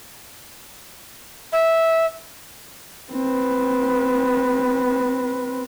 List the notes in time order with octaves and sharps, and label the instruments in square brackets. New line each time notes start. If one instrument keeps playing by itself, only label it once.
[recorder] E5
[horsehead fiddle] C4 B4